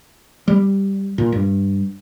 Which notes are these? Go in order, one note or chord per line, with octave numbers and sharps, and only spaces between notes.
G3
A#2
G2